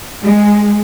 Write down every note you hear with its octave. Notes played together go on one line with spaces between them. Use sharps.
G#3